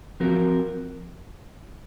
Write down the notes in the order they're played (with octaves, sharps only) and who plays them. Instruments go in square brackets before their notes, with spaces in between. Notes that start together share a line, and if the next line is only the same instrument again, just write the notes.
[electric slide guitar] F3 C4 F#4 A#4